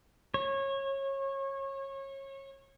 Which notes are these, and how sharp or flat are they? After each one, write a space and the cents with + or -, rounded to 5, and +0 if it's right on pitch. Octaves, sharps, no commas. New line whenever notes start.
C#5 -25